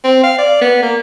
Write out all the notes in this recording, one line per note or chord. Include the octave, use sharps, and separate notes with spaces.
C4
F5
D5
B3
A#3